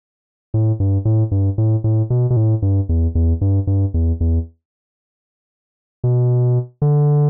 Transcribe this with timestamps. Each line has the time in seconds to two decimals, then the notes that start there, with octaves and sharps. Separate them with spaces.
0.54 A2
0.80 G2
1.05 A2
1.31 G2
1.58 A2
1.84 A2
2.10 B2
2.30 B2
2.37 A2
2.62 G2
2.89 E2
3.15 E2
3.41 G2
3.67 G2
3.94 E2
4.20 E2
6.04 B2
6.82 D3